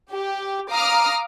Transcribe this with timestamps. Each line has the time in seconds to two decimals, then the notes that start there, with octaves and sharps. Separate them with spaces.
0.11 G4
0.70 F5 A#5 D6 D#6 F6